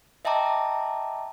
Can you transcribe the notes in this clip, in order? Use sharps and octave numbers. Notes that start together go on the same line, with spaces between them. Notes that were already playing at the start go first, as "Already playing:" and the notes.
D#5 E5 G5 A5 A#5 D6